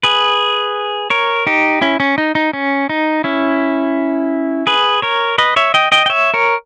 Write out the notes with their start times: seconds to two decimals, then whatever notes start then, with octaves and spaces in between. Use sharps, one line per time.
0.03 G#4 B4
1.10 A#4 C#5
1.47 D#4 G4
1.81 C#4 E4
2.00 C#4
2.18 D#4
2.35 D#4
2.53 C#4
2.89 D#4
3.24 C#4 E4
4.67 G#4 B4
5.02 A#4 C#5
5.38 B4 D#5
5.56 C#5 E5
5.74 D#5 G5
5.92 D#5 G5
6.06 G5
6.10 C#5 E5
6.34 A#4 C#5